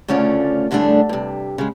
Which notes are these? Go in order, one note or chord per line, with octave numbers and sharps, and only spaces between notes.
D2 C#3 A3 C#4 F4 D5
A2 D3 G3 A3 D4 G#4
G2 C3
C#3 G#3